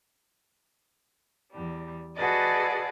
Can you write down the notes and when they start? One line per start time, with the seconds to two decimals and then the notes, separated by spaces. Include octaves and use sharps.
1.51 E2 G3
2.15 F#4 G#4 A4 B4 D5 D#5